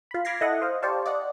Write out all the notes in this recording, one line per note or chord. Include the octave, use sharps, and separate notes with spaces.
F4 B5
B5 D6 F6 G#6 A#6 C7
E4 A4 D#5 F#5
C5 D#5 F5
G4 C5 D5 F5 A5 C#6
D5 D#5 F#5